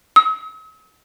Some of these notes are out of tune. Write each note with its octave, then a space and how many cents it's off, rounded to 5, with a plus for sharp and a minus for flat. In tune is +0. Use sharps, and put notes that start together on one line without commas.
E6 -45